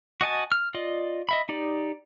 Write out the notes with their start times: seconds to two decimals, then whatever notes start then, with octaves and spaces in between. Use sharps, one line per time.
0.21 F#4 D#5 G#5 A5
0.52 F6
0.74 F4 D5 D#5
1.29 D#5 E5 B5
1.49 D#4 G4 D5